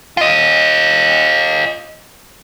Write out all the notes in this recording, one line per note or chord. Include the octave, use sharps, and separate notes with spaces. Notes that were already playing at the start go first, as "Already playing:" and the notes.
F4 D#5